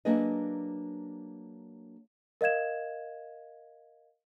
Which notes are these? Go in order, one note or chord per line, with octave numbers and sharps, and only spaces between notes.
F#3 A#3 D4 G#4 B4 D#5
A#4 D#5 F5 G#6 E7